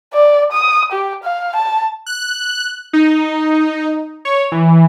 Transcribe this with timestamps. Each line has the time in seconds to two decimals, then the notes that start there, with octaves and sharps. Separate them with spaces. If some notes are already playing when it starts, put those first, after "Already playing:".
0.13 D5
0.52 D#6
0.92 G4
1.24 F5
1.56 A5
2.06 F#6
2.93 D#4
4.25 C#5
4.52 E3